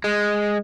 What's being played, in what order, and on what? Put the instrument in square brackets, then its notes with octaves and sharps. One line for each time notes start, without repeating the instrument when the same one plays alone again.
[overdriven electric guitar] G#3